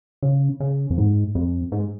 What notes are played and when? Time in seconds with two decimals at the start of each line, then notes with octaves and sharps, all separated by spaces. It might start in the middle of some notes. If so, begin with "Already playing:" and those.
0.23 C#3
0.60 C#3
0.90 F2
0.98 G#2
1.35 F2
1.72 G#2